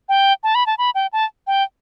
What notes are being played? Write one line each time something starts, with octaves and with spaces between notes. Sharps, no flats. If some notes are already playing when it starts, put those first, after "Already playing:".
G5
A5
B5
A5
B5
G5
A5
G5